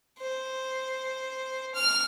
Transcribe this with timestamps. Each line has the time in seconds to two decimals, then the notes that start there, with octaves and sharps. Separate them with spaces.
0.19 C5
1.75 F6